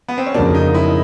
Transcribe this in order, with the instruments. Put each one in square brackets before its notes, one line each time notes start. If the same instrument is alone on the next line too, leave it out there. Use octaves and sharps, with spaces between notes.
[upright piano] B3
C4
C#4
[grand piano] F2 C#3 F#3 A#3 [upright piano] D4
[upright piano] D#4
E4